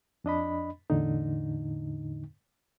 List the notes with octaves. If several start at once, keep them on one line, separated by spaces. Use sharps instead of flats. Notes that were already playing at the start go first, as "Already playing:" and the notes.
F2 D4 D#5 B5
E2 A2 D3 D#4